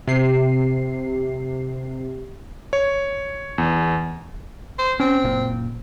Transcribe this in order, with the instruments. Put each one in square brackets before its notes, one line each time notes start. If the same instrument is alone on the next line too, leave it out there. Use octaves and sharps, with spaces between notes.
[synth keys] C3 C7
[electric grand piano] C#5
E2
[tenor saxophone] C5
[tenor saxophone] C4 [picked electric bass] C#4
[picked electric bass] F#1 A#2